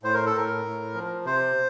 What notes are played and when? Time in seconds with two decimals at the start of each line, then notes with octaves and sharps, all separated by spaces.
0.03 A2 C5
0.14 A#4
0.26 A4
0.34 A2 A#4
0.65 A2
0.95 F3
1.25 C3 C5